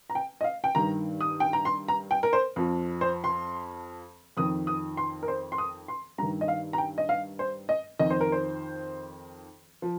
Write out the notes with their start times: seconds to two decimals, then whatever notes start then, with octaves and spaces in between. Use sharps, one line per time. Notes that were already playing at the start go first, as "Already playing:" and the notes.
0.10 A#5
0.15 G5
0.41 D#5
0.44 F5
0.64 G5
0.75 G2 D#3 A#5
1.21 D#6
1.40 G5
1.53 A#5
1.65 C6
1.88 A#5
2.11 G5
2.23 A#4
2.33 C5
2.56 F2 F3
3.01 C5
3.24 C6
4.37 F2 D#3 D#6
4.67 D#6
4.97 C6
5.23 A#4
5.28 C5
5.52 C6
5.58 D#6
5.88 C6
6.18 G2 D#3 A#5
6.41 D#5
6.48 F5
6.73 A#5
6.78 G5
6.98 D#5
7.09 F5
7.39 C5
7.69 D#5
7.99 F2 D#3 D#5
8.10 C5
8.21 A#4
8.32 C5
9.82 F3